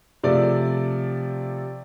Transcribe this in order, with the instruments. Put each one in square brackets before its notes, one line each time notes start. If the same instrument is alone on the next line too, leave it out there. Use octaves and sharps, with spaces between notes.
[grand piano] C3 F3 A3 D5